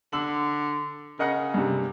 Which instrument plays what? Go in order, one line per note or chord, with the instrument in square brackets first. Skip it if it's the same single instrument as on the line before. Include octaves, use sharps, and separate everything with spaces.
[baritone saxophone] D3 [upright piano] E6 F#7
[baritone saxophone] C#3 [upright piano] A#4 D#5 F#5
[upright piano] G2 C3